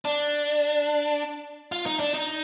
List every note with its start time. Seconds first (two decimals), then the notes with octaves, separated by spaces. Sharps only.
0.05 D4
1.72 F4
1.86 D#4
1.99 D4
2.14 D#4